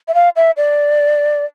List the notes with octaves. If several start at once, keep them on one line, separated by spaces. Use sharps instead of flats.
E5
F5
E5
D5